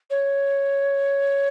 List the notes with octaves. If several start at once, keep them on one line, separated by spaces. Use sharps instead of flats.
C#5